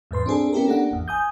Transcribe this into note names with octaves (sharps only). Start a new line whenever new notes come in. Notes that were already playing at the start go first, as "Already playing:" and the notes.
E2 G#2 B4 C6
C4 D4 G#4 A4
B3 C#4 E4 G4 A4 A#4
A#3 D4 F#5
G#1 E2
G#5 D#6 G6